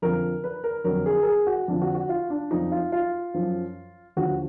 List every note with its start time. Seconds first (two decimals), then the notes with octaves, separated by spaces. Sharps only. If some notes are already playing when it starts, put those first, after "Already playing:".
0.02 F2 D3 F3 A#4
0.44 B4
0.64 A#4
0.84 F2 D3 F#3 A#4
1.06 G#4
1.22 A#4
1.26 G#4
1.47 F#4
1.68 F2 D3 F3 D4
1.82 F#4
1.95 F#4
2.09 F4
2.30 D4
2.51 F2 F3 D#4
2.72 F4
2.92 F4
3.34 F#2 F3
4.16 D#2 D3 F3 F#4